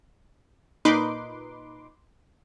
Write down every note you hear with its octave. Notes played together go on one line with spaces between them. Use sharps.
A#2 D#4 B4 C6 D6